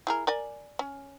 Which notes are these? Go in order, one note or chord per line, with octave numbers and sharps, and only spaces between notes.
E4 G#4 A#4
A#4 D5 G#5
C#4